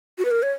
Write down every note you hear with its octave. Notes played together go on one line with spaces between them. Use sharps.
F#4
B4
A#4
C#5